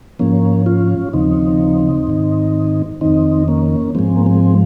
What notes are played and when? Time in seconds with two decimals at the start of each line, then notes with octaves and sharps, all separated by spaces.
0.19 G#2 F3 A#3 C#4
0.66 C#4 F4
1.13 D#2 C#3 F3 C4 D#4
2.07 G#2 D#3
3.01 F2 D#3 C4 D#4
3.48 A#3 C#4
3.95 G#2 F3 G#3 C4
4.16 A#3
4.26 G#3 C4